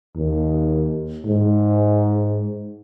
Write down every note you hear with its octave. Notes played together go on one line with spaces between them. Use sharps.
D#2
G#2